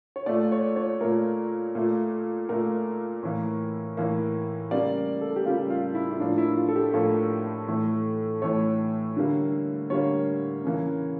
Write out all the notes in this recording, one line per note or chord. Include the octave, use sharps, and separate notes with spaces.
C#5
A#2 A3 D5
C#5
C#5
A#2 A3 A#4
A#2 A3
A#2 A3 A#4
A2 E3 A#3
A2 E3 A#3
C#3 G3 A#3 D5
A4
G4
C#3 G3 A#3 F4
F4
E4
E4
A2 F3 A#3 D4
E4
F4
A4
G4
A2 F3 A#3 A4
A2 E3 A3
A2 E3 A3 C#5
D3 G3 A#3
D3 G3 A#3 C#5
C#3 E3 A#3